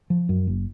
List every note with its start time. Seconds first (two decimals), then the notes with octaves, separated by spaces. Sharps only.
0.10 F3
0.29 F#2
0.47 F#1